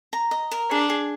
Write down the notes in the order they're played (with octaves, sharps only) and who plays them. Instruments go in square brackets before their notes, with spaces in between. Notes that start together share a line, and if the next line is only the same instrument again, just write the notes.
[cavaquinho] A#5
D#5
A#4
[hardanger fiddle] D4 [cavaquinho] G#4
[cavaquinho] G#4